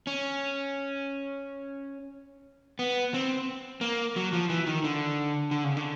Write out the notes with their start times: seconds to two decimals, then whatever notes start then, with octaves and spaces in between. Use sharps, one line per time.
0.07 C#4
2.79 B3
3.14 C4
3.81 A#3
4.16 F#3
4.33 F3
4.49 E3
4.66 D#3
4.84 D3
5.51 D3
5.64 C#3
5.77 D3